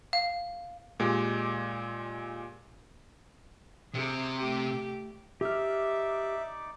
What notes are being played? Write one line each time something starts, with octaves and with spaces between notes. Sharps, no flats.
F5
A#2 G#3 G4 D6
C3 G#4
A3 G4
D#4 G4 D5 E5 D6 F6